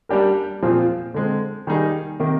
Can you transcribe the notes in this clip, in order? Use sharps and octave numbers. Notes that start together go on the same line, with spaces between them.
G3 A#3 D4 G4 A#4
A#2 F3 C4 F4 G#4
D3 G#3 C4
D#3 G3 A#3 D#4 G#4
C3 D#3 A#3